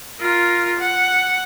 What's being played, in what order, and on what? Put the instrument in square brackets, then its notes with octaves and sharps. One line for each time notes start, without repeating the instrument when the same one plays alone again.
[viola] F4 A#4
F#5